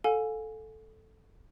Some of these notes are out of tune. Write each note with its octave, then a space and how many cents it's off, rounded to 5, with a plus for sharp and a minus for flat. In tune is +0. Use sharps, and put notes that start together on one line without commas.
A4 -5 F5 +40 G#5 +0